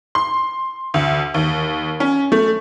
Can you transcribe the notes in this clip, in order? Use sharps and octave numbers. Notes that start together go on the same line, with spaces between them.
C6
D2
D#2
C#4
A3